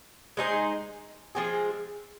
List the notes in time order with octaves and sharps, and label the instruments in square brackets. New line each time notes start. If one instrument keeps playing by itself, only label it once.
[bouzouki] G#3 D#4 G#4 C5
F3 G#3 C4 G#4